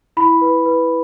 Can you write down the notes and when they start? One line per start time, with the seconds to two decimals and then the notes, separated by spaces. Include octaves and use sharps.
0.17 E4 B5
0.41 B4
0.66 B4